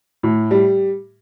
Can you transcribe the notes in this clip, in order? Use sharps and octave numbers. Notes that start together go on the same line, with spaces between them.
A2
G3